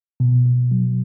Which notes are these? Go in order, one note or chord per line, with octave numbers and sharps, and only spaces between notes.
B2
B2
F#3